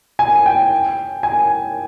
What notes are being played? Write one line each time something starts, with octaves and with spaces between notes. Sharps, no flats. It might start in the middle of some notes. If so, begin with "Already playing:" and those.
G#5
G5
G#5